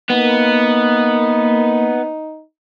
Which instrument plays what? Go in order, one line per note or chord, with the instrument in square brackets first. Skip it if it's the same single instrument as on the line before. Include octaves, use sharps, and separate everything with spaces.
[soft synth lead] A#3 [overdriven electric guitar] B3 [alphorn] D#4